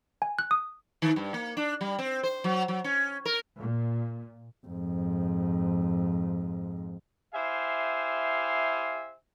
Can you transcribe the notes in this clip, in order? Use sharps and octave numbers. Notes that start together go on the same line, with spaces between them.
G#5
F#6
D#6
D#3
G2
A#3
D4
G3
C4
C5
F#3
F#3
C#4
A#4
A#2
F2 G#2
E4 G4 C5 E5 F5 G#5